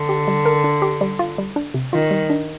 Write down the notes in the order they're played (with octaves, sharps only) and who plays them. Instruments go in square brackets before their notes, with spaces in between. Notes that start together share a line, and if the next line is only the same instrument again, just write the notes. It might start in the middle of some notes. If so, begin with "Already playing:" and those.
Already playing: [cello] D3
[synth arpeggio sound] G4
G3
A#4
D4
G4
G3
F4
G3
D4
C3
[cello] D#3 [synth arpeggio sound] F4
[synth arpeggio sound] G3
D4